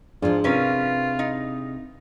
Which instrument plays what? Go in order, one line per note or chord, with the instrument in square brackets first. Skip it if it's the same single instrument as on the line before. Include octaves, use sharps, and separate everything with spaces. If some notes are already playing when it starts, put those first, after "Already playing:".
[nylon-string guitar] G#2 F3 [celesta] D4 G#4 D5 [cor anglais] F4
[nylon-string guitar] C3 [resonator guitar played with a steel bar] C#4 A#4 B4 [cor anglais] F4
[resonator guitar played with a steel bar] D#4